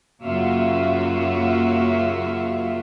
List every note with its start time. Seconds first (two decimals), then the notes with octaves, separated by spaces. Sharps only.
0.23 F#2 C#3 A#3 F4 F#4 E5